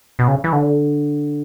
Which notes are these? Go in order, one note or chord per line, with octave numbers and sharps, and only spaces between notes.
B2
C#3
E3
D3